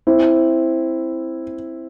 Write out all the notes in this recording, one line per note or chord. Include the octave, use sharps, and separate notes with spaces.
C4 E4